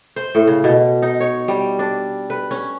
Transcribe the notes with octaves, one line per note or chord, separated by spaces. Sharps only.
C5
A2
C#3
B2
D#4
C#5
G3
D4
B4
C#4